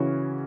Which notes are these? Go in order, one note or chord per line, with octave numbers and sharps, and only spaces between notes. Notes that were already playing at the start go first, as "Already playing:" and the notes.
Already playing: C#3 E3 C#4 F#4